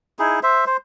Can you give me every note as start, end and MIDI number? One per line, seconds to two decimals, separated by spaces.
0.19 0.40 63
0.19 0.40 64
0.19 0.40 68
0.43 0.65 72
0.43 0.65 76
0.66 0.77 72